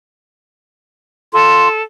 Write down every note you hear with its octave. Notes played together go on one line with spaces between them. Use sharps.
F4 A4